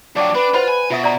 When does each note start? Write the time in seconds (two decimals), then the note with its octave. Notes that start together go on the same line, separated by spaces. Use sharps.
0.16 F3 F#3 D4 D5 F#5 G5
0.35 D4 B4
0.54 F4 C5 F#5 B5
0.68 G#5
0.90 B2 F4 E5 D#6
1.04 D5 A#5